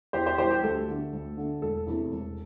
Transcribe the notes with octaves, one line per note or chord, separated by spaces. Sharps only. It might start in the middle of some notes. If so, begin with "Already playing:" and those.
E2 G4 C5
G4 C5
E3 G3 G4 C5
G4
D2 A4
D3 A3
D2
D3 A3
E1 A4
E2 C3 E3 A3
E1